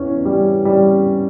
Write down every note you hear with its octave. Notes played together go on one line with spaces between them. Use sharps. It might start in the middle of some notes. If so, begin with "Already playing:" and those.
Already playing: E2 C#4
G3
G3